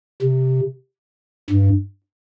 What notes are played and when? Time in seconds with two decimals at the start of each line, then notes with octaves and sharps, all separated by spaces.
0.22 C3
1.50 G2